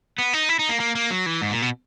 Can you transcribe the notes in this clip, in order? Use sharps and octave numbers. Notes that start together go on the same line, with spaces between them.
B3
D#4
E4
D#4
A#3
A#3
A#3
F#3
E3
G#2
A#2
B2